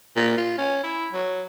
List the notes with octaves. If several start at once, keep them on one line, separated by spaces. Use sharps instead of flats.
A#2
F4
C#4
E4
F#3